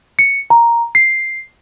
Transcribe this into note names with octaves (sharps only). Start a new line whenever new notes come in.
C#7
A#5
C7